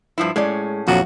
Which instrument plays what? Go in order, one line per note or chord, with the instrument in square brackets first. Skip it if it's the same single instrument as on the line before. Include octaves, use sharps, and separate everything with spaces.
[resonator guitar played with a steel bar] G2 F3 E4
[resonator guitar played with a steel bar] A2 C#4 [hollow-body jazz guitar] G#3 D5
[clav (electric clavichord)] A#1 F2 F#3 [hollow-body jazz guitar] F3 [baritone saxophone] F#4